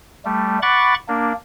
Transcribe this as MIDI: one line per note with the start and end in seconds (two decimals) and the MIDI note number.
0.25 0.59 55
0.25 0.59 57
0.62 0.94 78
0.62 0.94 83
0.62 0.94 85
0.62 0.94 86
0.62 0.94 90
0.62 0.94 93
1.08 1.33 58
1.08 1.33 62